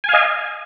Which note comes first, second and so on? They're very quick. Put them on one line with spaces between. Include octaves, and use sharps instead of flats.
G#5 F5 D#5